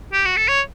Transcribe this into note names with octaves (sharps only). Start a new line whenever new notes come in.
G4
F#4
A4
C#5